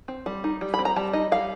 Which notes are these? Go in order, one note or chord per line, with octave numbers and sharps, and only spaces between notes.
C4
G3
D#4
G3
B5
C4
A#5
G3 A5
D#4 D#5
G3 F5